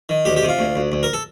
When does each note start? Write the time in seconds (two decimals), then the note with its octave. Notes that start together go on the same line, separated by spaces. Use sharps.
0.09 D#3
0.25 D2 G4
0.36 G4
0.43 C3
0.48 F4
0.59 D2
0.76 D2
0.92 D2
1.03 A#4
1.13 A4